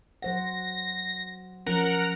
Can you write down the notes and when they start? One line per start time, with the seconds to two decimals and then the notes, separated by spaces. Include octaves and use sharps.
0.22 F#3 C5 F#5 A#6
1.66 F3 C#4 A#4 F#5 A#5